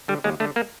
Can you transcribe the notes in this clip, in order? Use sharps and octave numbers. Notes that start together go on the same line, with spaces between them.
D3 G3
D#2 G#3
D3 A3
A#3